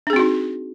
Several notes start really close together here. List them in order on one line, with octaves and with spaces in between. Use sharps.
D4 G#4 C4 F#4 D#4